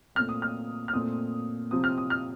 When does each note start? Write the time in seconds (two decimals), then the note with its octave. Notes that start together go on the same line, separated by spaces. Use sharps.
0.15 A#2 A3 C4 F6
0.29 D#6
0.42 F6
0.88 F6
0.93 A#2 A3 C4 D#6
1.71 C3 F3 C4 D#6
1.84 F6
1.98 D#6
2.10 F6